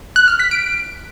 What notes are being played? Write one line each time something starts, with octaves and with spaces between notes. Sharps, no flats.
F#6
F6
B6
D7